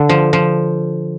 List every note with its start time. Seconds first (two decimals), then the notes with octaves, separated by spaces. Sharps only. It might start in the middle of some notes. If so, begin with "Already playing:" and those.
Already playing: D3
0.09 F3
0.33 F3